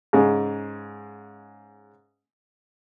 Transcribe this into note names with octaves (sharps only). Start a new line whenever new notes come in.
G#2 C#3 G#3